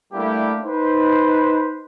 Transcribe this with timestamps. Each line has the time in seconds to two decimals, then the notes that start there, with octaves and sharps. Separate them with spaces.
0.13 G3 A3 A#3 D4 E4 G4
0.64 D#4 B4 C5